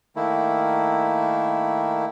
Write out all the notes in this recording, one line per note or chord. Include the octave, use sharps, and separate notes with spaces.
D#3 A3 A#3 E4